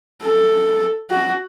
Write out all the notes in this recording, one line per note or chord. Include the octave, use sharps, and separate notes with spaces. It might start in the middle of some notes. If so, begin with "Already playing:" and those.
A4
F#4